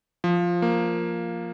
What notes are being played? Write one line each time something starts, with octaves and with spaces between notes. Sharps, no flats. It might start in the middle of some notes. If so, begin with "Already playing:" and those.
F3
A#3